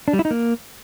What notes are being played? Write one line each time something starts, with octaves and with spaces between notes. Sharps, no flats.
D4
G3
E4
D#4
A#3